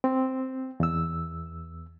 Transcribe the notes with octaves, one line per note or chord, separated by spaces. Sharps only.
C4
E2 E6